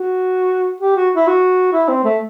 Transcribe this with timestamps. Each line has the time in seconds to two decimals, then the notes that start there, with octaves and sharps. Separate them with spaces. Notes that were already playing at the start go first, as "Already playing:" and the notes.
Already playing: F#4
0.81 G4
0.96 F#4
1.15 E4
1.27 F#4
1.72 E4
1.88 C4
2.04 A3